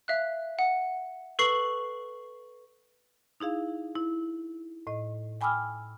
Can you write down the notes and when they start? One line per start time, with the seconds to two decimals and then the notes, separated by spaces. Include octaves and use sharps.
0.08 E5 F5 F#6
0.59 F#5
1.39 A4 B4 C#6 C7 F#7
3.40 D#4 E4 G#4 F5
3.96 E4
4.87 A2 D#5
5.41 G5 G#5 B5 D6 E6 F6